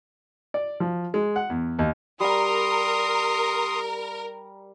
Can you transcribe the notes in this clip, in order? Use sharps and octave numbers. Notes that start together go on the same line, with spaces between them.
D5
F3
G#3
F#5
E2
D#2
G3 A#4 A#5 C6 D#6